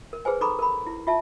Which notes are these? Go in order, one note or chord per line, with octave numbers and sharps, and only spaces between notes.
A#4
G#4 B4 C5 G#5
D#4 A4 A#5 B5 C#6 D6
A#4 B5
E4
F4 E5 A5